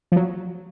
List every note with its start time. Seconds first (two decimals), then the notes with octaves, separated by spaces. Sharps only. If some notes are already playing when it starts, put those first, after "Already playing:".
0.12 F3
0.16 F#3